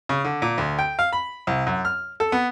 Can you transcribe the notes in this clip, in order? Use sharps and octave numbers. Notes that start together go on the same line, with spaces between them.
C#3
D3
A#2
D2
G5
F5
B5
C2
F#2
F6
A4
B3